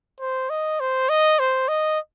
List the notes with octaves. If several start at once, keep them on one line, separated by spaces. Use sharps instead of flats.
C5
D#5
C5
D#5
C5
D#5